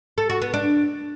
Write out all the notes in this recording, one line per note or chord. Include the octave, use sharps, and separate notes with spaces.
A4
F#4
B3
D4